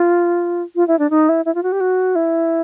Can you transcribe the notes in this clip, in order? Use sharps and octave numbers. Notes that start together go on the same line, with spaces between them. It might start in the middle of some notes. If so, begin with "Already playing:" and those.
Already playing: F4
F4
E4
D4
D#4
E4
E4
F4
F#4
G4
F#4
E4